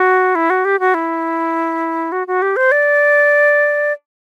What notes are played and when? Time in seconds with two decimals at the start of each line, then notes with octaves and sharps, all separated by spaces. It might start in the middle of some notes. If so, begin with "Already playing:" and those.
Already playing: F#4
0.35 E4
0.50 F#4
0.65 G4
0.80 F#4
0.94 E4
2.12 F#4
2.27 F#4
2.42 G4
2.56 C5
2.72 D5